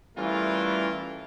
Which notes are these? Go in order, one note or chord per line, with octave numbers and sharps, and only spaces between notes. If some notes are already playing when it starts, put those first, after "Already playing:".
E3 G3 A3 C#4 F4 A#4